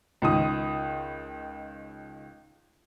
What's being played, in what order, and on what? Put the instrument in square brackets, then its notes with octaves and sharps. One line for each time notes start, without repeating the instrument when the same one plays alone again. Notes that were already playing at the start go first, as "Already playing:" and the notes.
[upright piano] C#2 D#3 D#6